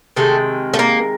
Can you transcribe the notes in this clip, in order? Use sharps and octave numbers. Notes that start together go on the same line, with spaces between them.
C3 D#3 G#3 A3
A3
A#3